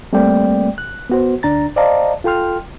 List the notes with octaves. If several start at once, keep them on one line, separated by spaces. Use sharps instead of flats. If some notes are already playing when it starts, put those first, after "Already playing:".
G3 A3 A#3 C4 D5 G5
F#6
B3 F#4 C5
D2 D4 A#5 A6
C5 D5 D#5 F5 A5 A#5
F4 A4 G5 C6 F6